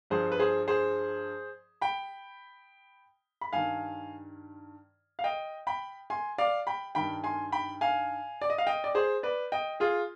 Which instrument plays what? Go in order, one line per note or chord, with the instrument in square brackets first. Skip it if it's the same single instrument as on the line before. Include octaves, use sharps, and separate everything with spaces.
[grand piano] G2 F3 G#4 C5
B4
G#4 C5
G#4 C5
G5 B5
B5
G2 D#3 F5 G#5
F5
D#5 G5
G5 B5
G#5 C6
D5 F5
G5 B5
G2 D#3 G5 B5
G#5 C6
G5 B5
F5 G#5
D5
D#5
F5
D#5 G5
D5
G#4 C5
B4 D5
D#5 G5
F4 G#4